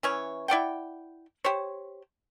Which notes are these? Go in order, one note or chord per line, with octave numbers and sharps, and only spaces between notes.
E3 C#4 C#5
E4 D5 F#5 G5
G4 C5 C#5